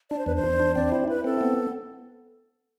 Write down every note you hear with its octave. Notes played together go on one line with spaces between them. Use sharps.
D4 D5
C5
E2 B4
C5
E2
D4
C4 D5
E4 C5
E4 B4
C4 A4
B3